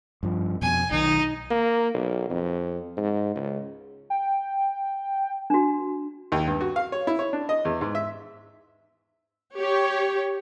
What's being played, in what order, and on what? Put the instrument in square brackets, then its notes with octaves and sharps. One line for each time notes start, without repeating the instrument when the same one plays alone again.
[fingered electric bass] G2 F3
[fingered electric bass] F2 B2 [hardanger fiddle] G#5
[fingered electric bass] B1 D#3 [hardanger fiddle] D#4
[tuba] A#3
B1
F2
G#2
C#2
[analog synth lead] G5
[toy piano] D4 F#4
[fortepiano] D#2
G2
F#4
F5
C#5
E4
C#5
D4
D#5
E2
G#2
E5
[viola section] G4 C#5